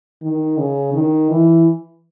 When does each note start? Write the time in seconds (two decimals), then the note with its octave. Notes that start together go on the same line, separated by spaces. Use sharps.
0.22 D#3
0.58 C#3
0.94 D#3
1.31 E3